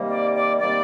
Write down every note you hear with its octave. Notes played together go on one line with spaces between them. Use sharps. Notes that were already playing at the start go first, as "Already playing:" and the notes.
Already playing: C3 D#3 G3 A#3
D5
D5
C3 D#3 G3 A#3 D5